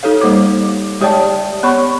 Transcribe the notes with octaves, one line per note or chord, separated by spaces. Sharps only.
D#4 G4 A4 C#5 F5
G3 A#3 C5 C#5 D6
G#3 G4 C#5 D5 G5 A5
B3 C#5 B5 C#6